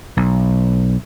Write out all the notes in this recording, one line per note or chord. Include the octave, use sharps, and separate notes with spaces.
B1